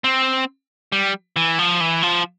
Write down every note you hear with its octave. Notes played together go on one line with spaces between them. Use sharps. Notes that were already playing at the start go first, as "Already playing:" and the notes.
C4
G3
E3
F3
E3
F3